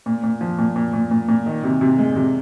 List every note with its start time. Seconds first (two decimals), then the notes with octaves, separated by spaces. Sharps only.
0.06 A#2
0.23 A#2
0.41 F3
0.58 A#2
0.76 A#2
0.93 A#2
1.11 A#2
1.28 A#2
1.46 D#3
1.63 C3
1.81 C3
1.98 G#3
2.16 C3